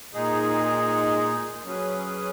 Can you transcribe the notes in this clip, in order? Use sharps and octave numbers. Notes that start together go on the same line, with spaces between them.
A#2 G#3 D#4 G#4
F#3 C#4 G#4 B4